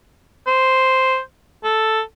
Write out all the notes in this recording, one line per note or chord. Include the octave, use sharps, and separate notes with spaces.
C5
A4